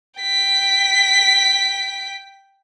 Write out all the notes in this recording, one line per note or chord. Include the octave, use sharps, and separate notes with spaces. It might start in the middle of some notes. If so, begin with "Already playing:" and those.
G5 B6